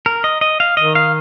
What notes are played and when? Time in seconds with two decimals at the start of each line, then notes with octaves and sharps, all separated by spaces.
0.06 A#4
0.24 D#5
0.41 D#5
0.60 F5
0.77 D#3 D#5
0.95 F5